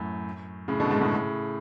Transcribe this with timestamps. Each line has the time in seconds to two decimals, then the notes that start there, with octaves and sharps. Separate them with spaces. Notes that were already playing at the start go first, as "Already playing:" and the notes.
Already playing: F#2 A2
0.68 A2 C#3
0.80 B2 D3
0.91 G#2
1.01 A2 C#3